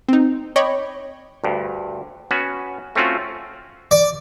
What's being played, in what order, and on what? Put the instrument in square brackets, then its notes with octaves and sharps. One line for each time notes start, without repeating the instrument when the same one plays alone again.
[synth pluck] C4 D#4
C#5 D#5 G5 B5 C#6 D6
[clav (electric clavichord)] D2 G2
B3 C#4 F#4
A3 C4 C#4 F4 F#4
[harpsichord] D5